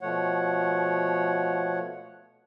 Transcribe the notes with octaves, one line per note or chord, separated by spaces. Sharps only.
B2 F3 A3 C#5 F#5